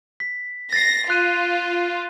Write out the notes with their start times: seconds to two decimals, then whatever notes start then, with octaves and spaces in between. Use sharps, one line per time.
0.20 B6
0.73 A6 A#6 C7
1.10 F4 F#6 D#7